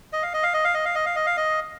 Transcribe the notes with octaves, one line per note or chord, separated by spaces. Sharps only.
D#5
F5
D#5
F5
D#5
F5
D#5
F5
D#5
F5
D#5
F5
D#5